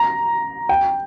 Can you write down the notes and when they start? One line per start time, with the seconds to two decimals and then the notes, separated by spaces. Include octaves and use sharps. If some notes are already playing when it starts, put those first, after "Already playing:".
Already playing: A#5
0.69 G5